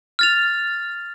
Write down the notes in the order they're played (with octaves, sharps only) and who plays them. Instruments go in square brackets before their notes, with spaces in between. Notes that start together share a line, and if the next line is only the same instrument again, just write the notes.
[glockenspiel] F6 A6 F7